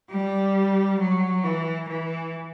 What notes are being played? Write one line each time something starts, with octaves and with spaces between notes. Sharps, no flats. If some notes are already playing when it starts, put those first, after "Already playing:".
G3
F#3
E3
E3